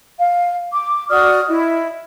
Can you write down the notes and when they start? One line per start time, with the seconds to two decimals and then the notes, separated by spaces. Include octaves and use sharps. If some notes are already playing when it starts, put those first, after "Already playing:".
0.19 F5
0.72 D6
1.09 F#4 D5 D#6 F6
1.47 E4 D#5